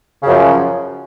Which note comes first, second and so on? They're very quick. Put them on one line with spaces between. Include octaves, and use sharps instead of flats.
C#3 F#2 F3